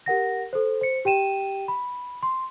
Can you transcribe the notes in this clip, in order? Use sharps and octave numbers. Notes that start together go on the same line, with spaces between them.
G4 A#4 F#5 A#6
A4 C5
C5 C#7
G4 G5 D#7 E7
B5
C6